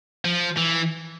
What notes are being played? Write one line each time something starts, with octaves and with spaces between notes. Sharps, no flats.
F3
E3